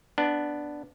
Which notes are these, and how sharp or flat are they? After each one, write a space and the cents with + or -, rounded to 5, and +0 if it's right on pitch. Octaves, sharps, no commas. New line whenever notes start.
B3 +0 D4 +0